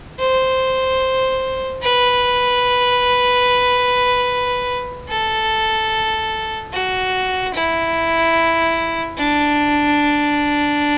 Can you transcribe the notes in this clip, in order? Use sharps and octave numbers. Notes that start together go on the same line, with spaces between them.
C5
B4
A4
F#4
E4
D4